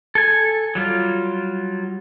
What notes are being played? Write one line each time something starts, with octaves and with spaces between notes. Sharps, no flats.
A4 G#5
F#3 G3 F4